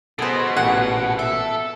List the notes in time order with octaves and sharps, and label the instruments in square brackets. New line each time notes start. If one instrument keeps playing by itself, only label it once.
[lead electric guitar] B2 [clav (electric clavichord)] B3 G#4 A4 [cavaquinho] C5 D#5
[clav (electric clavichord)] A1 A#2 G#4 [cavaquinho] F#5
[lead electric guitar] A4 [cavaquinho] E5